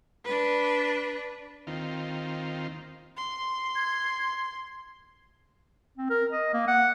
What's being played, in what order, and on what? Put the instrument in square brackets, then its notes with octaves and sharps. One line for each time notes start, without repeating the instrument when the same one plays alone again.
[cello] D4 B4
[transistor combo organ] D#2 D#3 C4 F4
[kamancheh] C6
[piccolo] G#6
[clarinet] C4
A#4
D#5
A#3
F#5